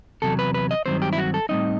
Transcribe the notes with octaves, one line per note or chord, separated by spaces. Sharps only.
E2 C3 F#3 A4
B4
B4
D#5
G2 D#3 F#3 C4 C5
G4
E4
F#4
A4
A2 G3 C4 D#4 D#5